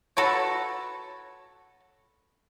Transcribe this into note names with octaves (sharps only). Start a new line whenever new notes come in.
F#4 A4 B4 C#5